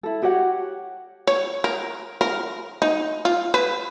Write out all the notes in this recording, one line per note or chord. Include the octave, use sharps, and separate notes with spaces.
E4 A4
F#4 G4 C#5 F#5
C#5
A#4
A#4
D#4
F4
B4